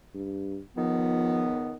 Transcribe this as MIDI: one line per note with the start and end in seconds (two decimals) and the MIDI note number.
0.14 0.58 43
0.77 1.75 37
0.77 1.75 51
0.77 1.47 53
0.77 1.75 59